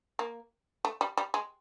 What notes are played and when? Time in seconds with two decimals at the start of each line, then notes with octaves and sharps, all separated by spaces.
0.19 A#3
0.85 A3
1.01 G3
1.18 G3
1.34 G#3